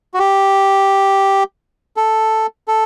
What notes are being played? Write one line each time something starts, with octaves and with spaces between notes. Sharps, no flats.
F#4
G4
A4
A4